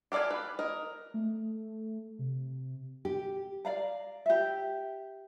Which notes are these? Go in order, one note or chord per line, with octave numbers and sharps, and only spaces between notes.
G4 A4 D5 F5 G#5
B4
A#4 D#5
A3
C3
G4
D5 F5 A#5
G4 E5